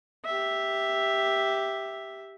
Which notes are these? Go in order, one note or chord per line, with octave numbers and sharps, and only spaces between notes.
G4 E5